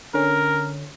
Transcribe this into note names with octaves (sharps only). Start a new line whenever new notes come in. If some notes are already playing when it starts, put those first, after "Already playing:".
D3 C#4 A#4